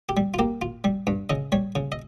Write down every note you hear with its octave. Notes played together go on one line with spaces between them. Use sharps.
G4
G3
F4
A#3 G4
F4
G3
G2
C#3 D#5
G3 C#5
C#3
D#5